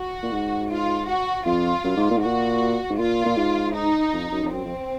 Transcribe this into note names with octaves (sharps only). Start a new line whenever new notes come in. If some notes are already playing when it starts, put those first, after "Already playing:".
Already playing: F#4
A#2
G#2
F4
F#4
F2 F4
F#2
G#2
A#2
G#2
A#2 F#4
G#2
A#2 F4
A#2
G#2
D#4
F2
F#2
F2
F#2 C4
F2